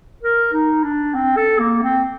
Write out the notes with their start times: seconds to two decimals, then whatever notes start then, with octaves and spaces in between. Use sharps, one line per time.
0.23 A#4
0.53 D#4
0.83 D4
1.14 C4
1.37 A4
1.59 A#3
1.82 C4